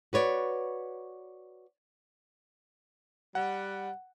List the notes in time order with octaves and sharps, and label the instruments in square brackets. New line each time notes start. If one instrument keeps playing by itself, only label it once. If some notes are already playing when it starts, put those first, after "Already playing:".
[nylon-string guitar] F#4 B4 C#5 D5
[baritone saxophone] G3 [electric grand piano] F#5